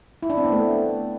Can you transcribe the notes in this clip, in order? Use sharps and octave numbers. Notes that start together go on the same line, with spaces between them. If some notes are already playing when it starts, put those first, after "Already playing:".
E4
D4
C4
B3
A3